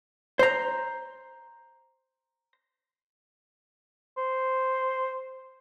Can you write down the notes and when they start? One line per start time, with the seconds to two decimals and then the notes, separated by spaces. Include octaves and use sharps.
0.39 C5 A#5
4.18 C5